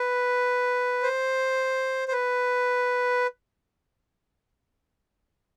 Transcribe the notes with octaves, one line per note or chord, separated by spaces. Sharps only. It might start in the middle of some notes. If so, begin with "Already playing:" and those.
Already playing: B4
C5
C5
B4